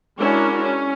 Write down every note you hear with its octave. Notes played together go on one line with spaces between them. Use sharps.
G#3 C#4 D4 E4 F#4 A#4
C#4